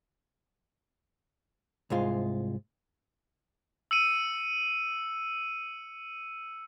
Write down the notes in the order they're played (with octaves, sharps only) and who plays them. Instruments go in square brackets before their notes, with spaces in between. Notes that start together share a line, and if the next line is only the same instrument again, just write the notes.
[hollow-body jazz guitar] C2 G#2 G#3 F4
[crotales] E6 C#7 D#7